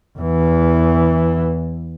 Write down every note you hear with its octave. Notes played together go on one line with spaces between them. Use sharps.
E2 E3